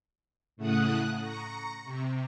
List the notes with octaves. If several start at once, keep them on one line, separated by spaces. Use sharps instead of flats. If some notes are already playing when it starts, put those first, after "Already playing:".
A2 C#3 A3 F#5 D#6 F#6
A#5 C#6
C3